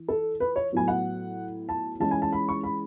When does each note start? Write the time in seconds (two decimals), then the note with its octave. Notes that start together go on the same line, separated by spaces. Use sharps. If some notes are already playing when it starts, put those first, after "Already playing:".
Already playing: E3
0.08 A4
0.40 B4
0.56 C#5
0.72 A2 F#3 B3 G#5
0.88 F#5
1.69 A5
2.00 E3 G#3 C#4 A5
2.11 G#5
2.22 A5
2.32 B5
2.49 C#6
2.64 B5